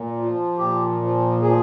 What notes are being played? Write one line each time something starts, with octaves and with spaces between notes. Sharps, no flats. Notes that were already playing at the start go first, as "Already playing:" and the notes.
Already playing: A#2
F3
A#2 G4
F3
F3 G#4